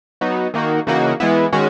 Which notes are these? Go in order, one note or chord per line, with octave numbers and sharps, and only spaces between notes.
F#3 B3 D#4 F#4
D#3 A#3 D#4 F#4
C#3 E3 A#3 D#4 F#4
E3 G#3 B3 E4
D#3 G#3 C#4 F#4